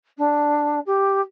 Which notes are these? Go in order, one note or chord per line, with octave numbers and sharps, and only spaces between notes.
D4
G4